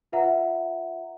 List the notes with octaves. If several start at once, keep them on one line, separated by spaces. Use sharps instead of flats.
F4 B4 E5 F#5 A#5